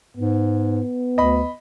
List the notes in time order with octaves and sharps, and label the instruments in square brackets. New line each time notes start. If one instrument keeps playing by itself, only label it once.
[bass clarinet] G#2 [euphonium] B3
[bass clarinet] D2 [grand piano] D#5 B5